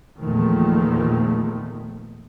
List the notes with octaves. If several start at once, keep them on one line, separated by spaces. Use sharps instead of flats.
E2 A#2 D#3 F3 A3